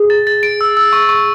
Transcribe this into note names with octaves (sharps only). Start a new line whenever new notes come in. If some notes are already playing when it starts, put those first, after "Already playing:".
Already playing: G#4
A6
A6
D7
E6
E6
C#6
C#6